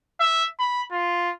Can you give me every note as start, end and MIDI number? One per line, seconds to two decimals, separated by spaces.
0.20 0.45 76
0.59 0.82 83
0.92 1.32 65